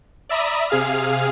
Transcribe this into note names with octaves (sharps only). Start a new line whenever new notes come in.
D5 E5 A#5 B5 D#6
C3 G#4 F5 F6